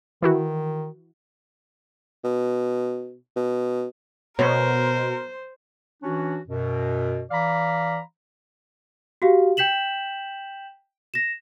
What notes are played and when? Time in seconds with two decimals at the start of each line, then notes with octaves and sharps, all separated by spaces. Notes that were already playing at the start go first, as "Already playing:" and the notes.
0.22 D#3 E3 E4 F#4
2.24 B2
3.36 B2
4.39 B2 A#4 C5 C#5
6.03 E3 C#4 D4 F#4
6.48 F#2 B2
7.31 E3 D5 F5 A#5 B5
9.22 F#4 G4 F5
9.57 G5 G6 B6 E7 F#7
11.14 A#6 E7